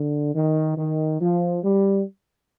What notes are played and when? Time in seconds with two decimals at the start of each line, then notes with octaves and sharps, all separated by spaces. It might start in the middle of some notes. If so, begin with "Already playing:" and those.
Already playing: D3
0.34 D#3
0.77 D#3
1.21 F3
1.63 G3